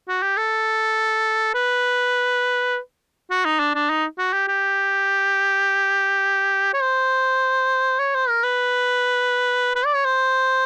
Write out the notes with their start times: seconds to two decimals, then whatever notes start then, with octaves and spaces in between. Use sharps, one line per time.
0.08 F#4
0.23 G4
0.37 A4
1.55 B4
3.31 F#4
3.45 D#4
3.60 D4
3.75 D4
3.90 D#4
4.19 F#4
4.33 G4
4.48 G4
6.74 C#5
6.82 C5
7.99 C#5
8.15 C5
8.29 A#4
8.44 B4
9.76 B4
9.86 D5
9.95 C#5
10.05 C5